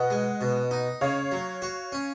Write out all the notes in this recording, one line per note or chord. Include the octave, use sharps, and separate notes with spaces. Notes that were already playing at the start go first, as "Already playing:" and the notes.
Already playing: B2 D#5 F#5
G#3
B2
D#4
C#3 C#5 F5
F#3
F#4
C#4